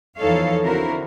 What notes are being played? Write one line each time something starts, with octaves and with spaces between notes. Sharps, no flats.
E2 F3 D#4 A4 C#5 F5
D3 C4 E4 F#4 A#4